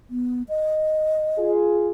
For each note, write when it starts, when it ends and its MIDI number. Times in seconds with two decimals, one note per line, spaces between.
0.10 0.43 59
0.49 1.51 75
1.38 1.91 65
1.38 1.91 68